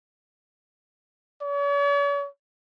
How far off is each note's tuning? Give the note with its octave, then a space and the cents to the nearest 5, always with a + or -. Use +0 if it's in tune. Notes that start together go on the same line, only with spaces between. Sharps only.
C#5 +45